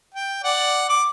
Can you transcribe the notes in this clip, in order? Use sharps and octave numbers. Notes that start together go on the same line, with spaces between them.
G5
D5 F#5
D6